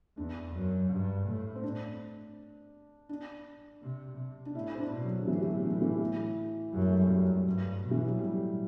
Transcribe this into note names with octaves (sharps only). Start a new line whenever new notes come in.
E2 D4
F#2
G2
A2
C4
D4
D4
C3
C3
D4
A2 E4
C4
D4
B2
F#3
D3
A2 E3
E3
F#3
E3
E3
F#2 G3
A3
G3
F#2
F#3
G2
B2
E3
F#3
A2 G3